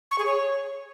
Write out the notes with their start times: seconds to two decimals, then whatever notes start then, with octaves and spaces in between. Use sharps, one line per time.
0.11 C#6
0.18 G#4
0.26 C#5